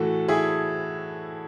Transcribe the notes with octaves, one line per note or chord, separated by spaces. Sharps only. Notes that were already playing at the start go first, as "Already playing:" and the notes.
Already playing: A2 E3 A3 F#4 A4
E4 G#4